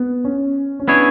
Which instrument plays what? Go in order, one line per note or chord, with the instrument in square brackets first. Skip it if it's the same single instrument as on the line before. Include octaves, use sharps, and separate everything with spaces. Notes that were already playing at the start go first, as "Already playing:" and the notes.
Already playing: [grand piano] B3
C#4
C#4
[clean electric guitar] B3 E4 G#4 C#5 [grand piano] D4